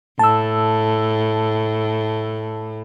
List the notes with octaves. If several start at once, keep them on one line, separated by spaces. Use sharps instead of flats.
A2 A5 E6